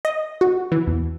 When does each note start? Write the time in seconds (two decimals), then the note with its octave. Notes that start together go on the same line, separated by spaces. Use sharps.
0.05 D#5
0.41 F#4
0.72 E3
0.87 E2